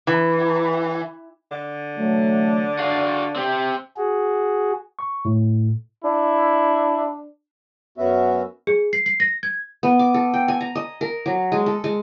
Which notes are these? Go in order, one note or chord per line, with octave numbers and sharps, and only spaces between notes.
E3
D3
E3 F#3 A3
D4 F#4 F5
C4 G4
F#4 G#4
C#6
A2
D4 E4
F#2 B3 C#4 F#4 E5
G#4
C7
C7
A#6
G#6
B3
D6
A4
G5
G#5
A#5
D#5
A#4
F#3
G#3
A4
G#3